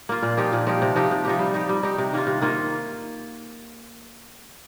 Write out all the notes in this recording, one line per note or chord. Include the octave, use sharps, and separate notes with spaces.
A#3 F4
A#2
F3 D#4 G4
A#2
F3 D#4 G4
C3
F3 D#4 G4
C3
F3 D#4 G4
G3
D#4 G4
G3
D#4 G4
C3
D#3 A#3 F4
C3
D#3 A#3 F4